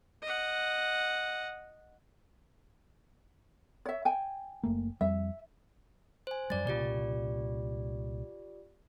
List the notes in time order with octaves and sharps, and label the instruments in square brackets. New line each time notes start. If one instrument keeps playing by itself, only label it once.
[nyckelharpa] D#5 F#5
[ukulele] C#5 E5
G5 G#5
[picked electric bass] F#1 A3 A#3
[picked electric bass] F2 G3 [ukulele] E5
[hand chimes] C5 G#5
[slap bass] F#2 G3 [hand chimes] D5 A6
[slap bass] C2 A#2 C#3 [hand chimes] F4 G4 D5